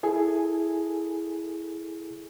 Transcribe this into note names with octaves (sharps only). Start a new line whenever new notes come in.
E4 G#4 A4 G#5